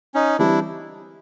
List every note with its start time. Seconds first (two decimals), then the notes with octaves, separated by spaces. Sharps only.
0.15 C#4 D#4
0.39 E3 G3 C4 D4 E4